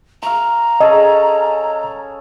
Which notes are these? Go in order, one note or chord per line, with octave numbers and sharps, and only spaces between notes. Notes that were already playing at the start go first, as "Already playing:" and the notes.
F5 A#5 C#6
C#4 G#4 A4 D#5